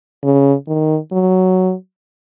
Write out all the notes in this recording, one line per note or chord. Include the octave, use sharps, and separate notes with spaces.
C#3
D#3
F#3